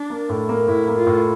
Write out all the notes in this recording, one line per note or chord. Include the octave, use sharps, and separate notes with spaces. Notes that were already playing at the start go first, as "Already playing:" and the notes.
Already playing: D4
A#3
A2
A#3
A2 E4
A#3
F4
A2